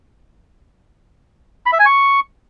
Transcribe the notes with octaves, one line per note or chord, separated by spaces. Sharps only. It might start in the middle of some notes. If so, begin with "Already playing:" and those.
B5
E5
G#5
C#6